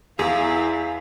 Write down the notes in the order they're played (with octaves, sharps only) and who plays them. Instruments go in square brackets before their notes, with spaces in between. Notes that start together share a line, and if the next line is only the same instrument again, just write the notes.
[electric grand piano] E2 [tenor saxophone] E4 [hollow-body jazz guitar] G#4 [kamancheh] F5